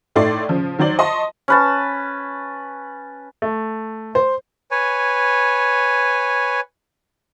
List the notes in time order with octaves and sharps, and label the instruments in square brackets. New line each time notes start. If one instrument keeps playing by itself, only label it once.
[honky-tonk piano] A2 A3 D#4 D5 C6 C7
C#3 F3
D#3 F#3 C5 D5 F#7
D#5 A5 C6 C#6
[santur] C#4 B4 A5
[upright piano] A3
C5
[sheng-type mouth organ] B4 C#5 G#5